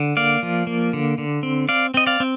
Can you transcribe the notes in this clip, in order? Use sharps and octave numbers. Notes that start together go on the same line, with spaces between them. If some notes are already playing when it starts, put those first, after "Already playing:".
Already playing: D3
A#3 D5 F5
F3
A#3
D3
D3
C4
C4 D5 F5
C4 D#5
D5 F5
C4